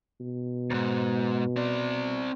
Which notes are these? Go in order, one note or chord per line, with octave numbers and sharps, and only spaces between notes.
B2
D2 G#2
C4 D5